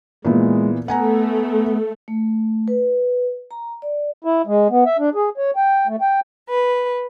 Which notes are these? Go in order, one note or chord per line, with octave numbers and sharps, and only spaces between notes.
A#2 E3 G#3 B3
A3 B3 F#5 G#5 A#5
A3
B4
A#5
D5
E4
G#3
B3
E5
D4
G#4
C#5
G5
A3
G5
B4